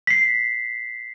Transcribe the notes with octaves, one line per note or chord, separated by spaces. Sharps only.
B6 C7